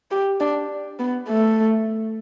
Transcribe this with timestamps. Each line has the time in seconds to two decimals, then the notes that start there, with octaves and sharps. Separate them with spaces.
0.11 G4
0.40 D4
0.99 B3
1.29 A3